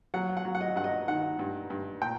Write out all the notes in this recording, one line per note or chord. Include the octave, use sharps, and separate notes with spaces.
F#3 F#5
F#5
F#3
F#5
D#5
G2 F#5
D#5
D#3 F#5
G2
G2
A#2 G5